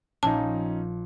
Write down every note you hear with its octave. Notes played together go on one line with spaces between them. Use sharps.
A#1 A#2 C#4 D#4 A5